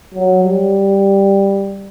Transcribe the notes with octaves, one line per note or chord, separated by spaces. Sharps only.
F#3
G3